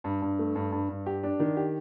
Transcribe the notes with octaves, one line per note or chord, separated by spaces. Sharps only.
G2
G2
A3
G2
G2
G2
G4
D4
D#3
G4